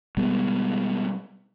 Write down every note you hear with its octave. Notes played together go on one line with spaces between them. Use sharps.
B2 G3 G#3 B3